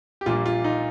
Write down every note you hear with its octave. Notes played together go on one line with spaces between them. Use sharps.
G4
A#1 A#2 G3 A#3 F4
F4
D#4